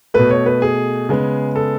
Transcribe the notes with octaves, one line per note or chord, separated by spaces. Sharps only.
B2 A3 B4
C#5
B4
G#4
C#3 G#3 B3
A4